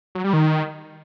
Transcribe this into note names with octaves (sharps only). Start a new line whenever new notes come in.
F#3
G3
D#3